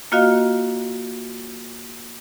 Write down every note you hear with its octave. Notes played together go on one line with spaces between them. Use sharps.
A#3 F4 F#4 D#5 F5